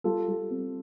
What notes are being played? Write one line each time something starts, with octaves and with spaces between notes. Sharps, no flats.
G3 F4 A4
G3
C4